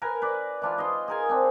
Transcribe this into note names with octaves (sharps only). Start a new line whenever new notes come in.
A#4 B4 G#5
B4 D5
E3 D4 F4
D#5 C6
G#4 A#4 G#5
C4 D4